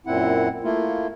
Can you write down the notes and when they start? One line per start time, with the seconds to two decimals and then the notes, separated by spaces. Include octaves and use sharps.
0.06 F#2 A#2 C4 E4 F#5
0.64 A3 A#3 E4 F4